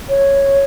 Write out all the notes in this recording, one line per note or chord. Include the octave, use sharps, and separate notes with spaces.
C#5